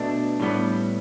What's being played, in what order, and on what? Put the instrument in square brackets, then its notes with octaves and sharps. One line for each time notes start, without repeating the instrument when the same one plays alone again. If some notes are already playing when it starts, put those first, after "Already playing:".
Already playing: [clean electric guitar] B2 A3 D4
A2 G3 B3